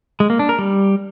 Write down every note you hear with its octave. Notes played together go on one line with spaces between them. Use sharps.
G#3
A#3
D4
A#4
G3